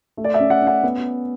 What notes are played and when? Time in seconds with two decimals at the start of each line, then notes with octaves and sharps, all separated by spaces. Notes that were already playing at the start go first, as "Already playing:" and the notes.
0.17 A3
0.24 D5
0.34 E5
0.39 C#4
0.50 F#5
0.62 C#4
0.67 F#5
0.83 B3